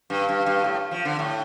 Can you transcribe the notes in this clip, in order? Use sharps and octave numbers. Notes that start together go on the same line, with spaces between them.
G2
G2
G2
A2
F3
D3
A2